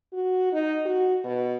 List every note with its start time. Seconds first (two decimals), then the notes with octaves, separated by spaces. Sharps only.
0.13 F#4
0.53 D#4
0.85 F#4
1.24 B2